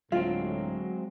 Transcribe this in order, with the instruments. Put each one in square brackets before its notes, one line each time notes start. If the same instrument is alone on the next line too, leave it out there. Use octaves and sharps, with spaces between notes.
[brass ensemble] D2 A2 A3 [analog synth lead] F#3 [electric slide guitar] G#3 C4 [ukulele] F4